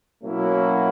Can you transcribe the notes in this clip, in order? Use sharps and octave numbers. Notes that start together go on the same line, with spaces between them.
B2 F#3 A#3 C#4 E4